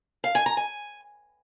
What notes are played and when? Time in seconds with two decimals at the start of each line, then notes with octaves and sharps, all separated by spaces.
0.24 F5
0.35 G#5
0.46 A#5
0.57 G#5